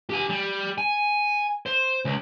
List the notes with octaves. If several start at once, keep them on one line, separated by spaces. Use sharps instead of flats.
G4 G#5
G3
G#5
C5
C#2